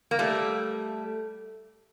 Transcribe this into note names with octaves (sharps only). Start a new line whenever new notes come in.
A#3
G3 A3